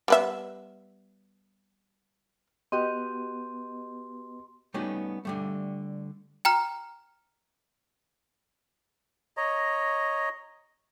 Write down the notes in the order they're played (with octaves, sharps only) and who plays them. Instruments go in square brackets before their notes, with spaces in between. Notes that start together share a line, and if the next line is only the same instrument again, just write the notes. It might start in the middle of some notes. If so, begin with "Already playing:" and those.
[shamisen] G3 B3 E5
[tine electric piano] B3 [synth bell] F#4 G4 D#5 [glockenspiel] C6
[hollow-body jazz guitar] G3 A3 B3 C#4 D#4 F#4
D3 G3 A3
[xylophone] G5 A#5 F6
[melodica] C#5 D#5 A#5